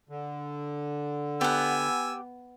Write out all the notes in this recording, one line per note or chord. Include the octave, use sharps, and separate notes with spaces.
D3
B3 G4 F#5 G#5 E6